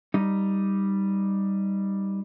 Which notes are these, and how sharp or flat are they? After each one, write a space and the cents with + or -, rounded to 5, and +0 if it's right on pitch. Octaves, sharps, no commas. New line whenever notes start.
G3 +0 D#4 +0